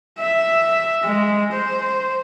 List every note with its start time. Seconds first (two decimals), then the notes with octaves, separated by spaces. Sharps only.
0.19 E5
1.03 G#3
1.52 C5